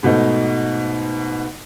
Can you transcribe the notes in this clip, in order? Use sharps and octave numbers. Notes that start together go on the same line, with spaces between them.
G#2 B2 A3 D#4